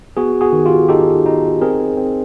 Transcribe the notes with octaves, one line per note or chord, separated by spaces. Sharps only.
B3 F#4 G#4
F#4 G#4
D#3
F4 G4
D#4 G4 A4
D#4
C4 G#4 A#4
C4